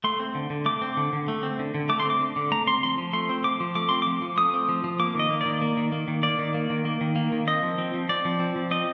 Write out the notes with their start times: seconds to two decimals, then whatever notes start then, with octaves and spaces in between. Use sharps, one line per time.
0.04 A3 C6
0.20 C4
0.35 D3
0.50 D3
0.66 A3 D6
0.82 C4
0.97 D3
1.13 D3
1.28 A3
1.43 C4
1.59 D3
1.74 D3
1.89 A3 D6
2.00 C6
2.06 C4 D6
2.21 D3
2.36 D3
2.52 A3 A#5
2.67 C4 C6
2.83 F3 C6
2.98 F3
3.13 A3 C6
3.29 C4
3.44 F3 D6
3.60 F3
3.75 A3 D6
3.89 C4 C6
4.02 F3 D6
4.22 F3
4.37 A3 D#6
4.54 C4
4.69 F3
4.84 F3
4.99 A#3 D6
5.15 D#3 D#5
5.30 A#3
5.41 D#3 D5
5.61 A#3
5.77 D#3
5.92 A#3
6.08 D#3
6.23 A#3 D5
6.39 D#3
6.54 A#3
6.70 D#3
6.85 A#3
7.01 D#3
7.16 A#3
7.32 D#3
7.47 C4 D#5
7.63 F3
7.78 C4
7.94 F3
8.09 C4 D5
8.25 F3
8.40 C4
8.56 F3
8.71 C4 D#5